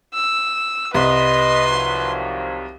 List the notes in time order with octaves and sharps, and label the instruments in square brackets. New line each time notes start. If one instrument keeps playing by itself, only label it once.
[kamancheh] E6
[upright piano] C2 [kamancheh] B4 [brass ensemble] D#5 [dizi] C6
[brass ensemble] D#3 F3 F#3